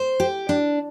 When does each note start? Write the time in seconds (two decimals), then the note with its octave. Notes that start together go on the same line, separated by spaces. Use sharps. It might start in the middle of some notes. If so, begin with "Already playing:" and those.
Already playing: C5
0.20 G4
0.49 D4